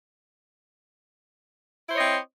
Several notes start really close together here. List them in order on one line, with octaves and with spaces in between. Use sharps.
E4 C5 C#5 D#5 C4